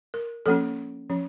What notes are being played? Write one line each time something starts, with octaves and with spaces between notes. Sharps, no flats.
A#4
F3 A#3 C#4 A4
F3 C#4